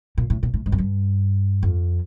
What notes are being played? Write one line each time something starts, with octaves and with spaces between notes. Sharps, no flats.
A#2
A2
A#2
A2
G#2
F#2
G2
F2